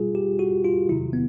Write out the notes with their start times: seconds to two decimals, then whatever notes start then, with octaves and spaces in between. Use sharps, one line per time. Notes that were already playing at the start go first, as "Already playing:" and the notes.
Already playing: B2 G3 F4 G#4
0.15 G4
0.39 F#4
0.64 F4
0.89 E2 C3 D#3 F#3 E4
1.13 B3